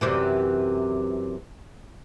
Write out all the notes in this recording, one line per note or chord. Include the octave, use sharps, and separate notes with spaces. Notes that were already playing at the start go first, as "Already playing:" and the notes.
F#2 C3 E3